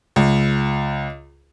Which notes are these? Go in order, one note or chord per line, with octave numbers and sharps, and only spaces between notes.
C#2